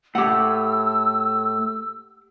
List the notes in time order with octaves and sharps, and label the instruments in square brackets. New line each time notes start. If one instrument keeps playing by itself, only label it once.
[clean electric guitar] A2 [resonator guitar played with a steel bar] G4 F#5 [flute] E6